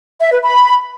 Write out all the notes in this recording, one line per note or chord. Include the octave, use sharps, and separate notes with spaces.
E5
B4
B5